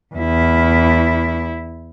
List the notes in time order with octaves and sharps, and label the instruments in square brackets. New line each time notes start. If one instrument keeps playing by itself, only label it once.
[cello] E2 E4